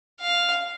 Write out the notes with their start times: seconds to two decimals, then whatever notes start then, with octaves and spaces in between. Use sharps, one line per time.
0.21 F5